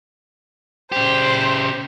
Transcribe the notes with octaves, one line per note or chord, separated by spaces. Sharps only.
C#3 G4 C5